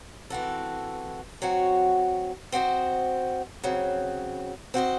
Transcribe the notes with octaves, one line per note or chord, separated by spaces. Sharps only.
E3 C4 F#4 A4
F#3 C4 F#4 C#5
C4 F#4 C5 D#5
C#3 F#3 C4
C4 F#4 C5 D#5